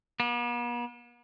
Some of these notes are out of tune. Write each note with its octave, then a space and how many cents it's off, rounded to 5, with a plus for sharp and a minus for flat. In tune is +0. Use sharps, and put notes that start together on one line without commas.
B3 -45